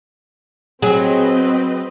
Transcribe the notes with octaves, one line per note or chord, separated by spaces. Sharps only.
F#3 C4 G#4 B4 D#5